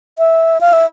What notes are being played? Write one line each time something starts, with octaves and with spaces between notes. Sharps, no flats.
E5
F5
E5